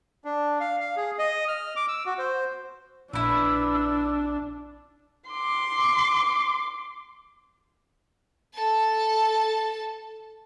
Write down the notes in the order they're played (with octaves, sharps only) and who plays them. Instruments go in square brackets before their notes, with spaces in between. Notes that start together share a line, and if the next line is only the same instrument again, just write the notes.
[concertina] D4
F5
F5
G#4
D#5
F6
D6
E6
F#4
C5
[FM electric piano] A#1 [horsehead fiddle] D4 [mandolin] E4 B4 [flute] E6
[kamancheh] C6 D6
[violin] A4 A5